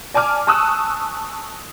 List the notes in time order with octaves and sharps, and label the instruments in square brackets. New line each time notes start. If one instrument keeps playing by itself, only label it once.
[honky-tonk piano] D5 G#5 A5 D6 F6
G#5 A5 C#6 D#6 E6 F#6